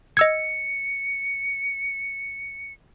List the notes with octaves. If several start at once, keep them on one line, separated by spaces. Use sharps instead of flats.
D#5 E6 G#6 C#7